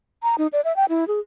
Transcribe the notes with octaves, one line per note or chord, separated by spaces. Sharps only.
A#5
D#4
D5
E5
G5
E4
G#4